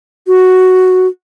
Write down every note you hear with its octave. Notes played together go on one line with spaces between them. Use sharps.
F#4